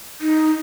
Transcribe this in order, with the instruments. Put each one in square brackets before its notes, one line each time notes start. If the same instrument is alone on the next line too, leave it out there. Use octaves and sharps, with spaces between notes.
[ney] D#4